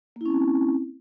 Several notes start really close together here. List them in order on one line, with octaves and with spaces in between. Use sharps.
A#3 E4 C#4 C4